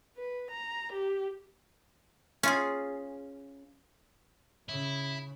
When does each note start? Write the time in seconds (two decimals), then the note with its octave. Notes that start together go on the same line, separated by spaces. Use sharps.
0.17 B4
0.50 A#5
0.93 G4
2.43 C#4 F4 G#4
4.69 C#3 E4